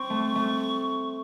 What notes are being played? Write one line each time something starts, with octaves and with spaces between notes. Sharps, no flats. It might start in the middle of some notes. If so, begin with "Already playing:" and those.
Already playing: C4 C#6
A3
A3